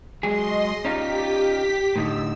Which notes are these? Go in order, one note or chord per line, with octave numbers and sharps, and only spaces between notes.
F#3 G#3 G#4 D#5 C6
C#4 D#4 F4 G4 B6
A2 D3 D#4 E6